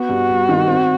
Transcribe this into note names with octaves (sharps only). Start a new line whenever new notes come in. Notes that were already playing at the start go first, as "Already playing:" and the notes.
Already playing: B3 F#4
G2
G3
D#3
C4